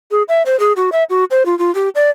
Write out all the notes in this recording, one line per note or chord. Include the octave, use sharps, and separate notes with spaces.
G#4
E5
C5
G#4
F#4
E5
F#4
C5
F4
F4
G4
D5